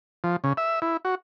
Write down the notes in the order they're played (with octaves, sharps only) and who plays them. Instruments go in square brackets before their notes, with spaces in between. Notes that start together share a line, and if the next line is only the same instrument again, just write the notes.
[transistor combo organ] F3
C#3
E5
E4
F#4